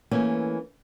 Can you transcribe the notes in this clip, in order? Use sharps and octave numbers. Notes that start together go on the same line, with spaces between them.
E3 A3 A#3 C#4